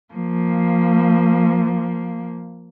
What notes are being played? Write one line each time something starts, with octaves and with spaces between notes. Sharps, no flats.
F3 A#3